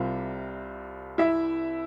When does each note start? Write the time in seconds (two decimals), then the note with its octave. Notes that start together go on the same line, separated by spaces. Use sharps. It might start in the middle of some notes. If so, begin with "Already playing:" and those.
Already playing: C2 C3 G3 C4 F4
1.18 E4 E5